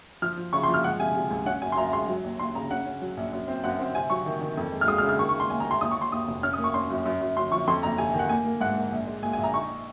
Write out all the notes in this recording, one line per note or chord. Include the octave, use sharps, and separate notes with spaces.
F3 F6
F3
C#3 C#6
C6
F3
F6
G#3 F#5
C3 G#5
C3
C#2
C#4 F#5
F#2 G#5
C6
F#2 A#5
G#3 C6
F#3
D#2
D#2 C6
C#3 A#5
C#4 F#5
C#4
F#3
A#1
F#2
C4
F#2 F#5
C4
C3 G#5
F#3 C#6
D#3
D#3
F2
G#3
F6
G#3 D#6
F6
C#3
F6
D#3 C#6
C#6
G#3
C6
D#2 G#5
A#5
G#3
C6
D#2 D#6
C#6
D#2
C6
D#2 D#6
F1
C#4 F6
D#6
A#3
C#6
C#4 C6
F#2
F#2
F#2
F#2 C6
F3 C#6
F2 C6
F#1 A#5
C3 G#5
D#3
F#5
A#3 G#5
A#3
G#2 F#5
A#3
A#1
G#3
A#2 G#5
G#5
A#1 A#5
D#4 C#6
D#4